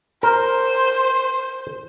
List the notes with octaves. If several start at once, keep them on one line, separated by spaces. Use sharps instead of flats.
A#4 C5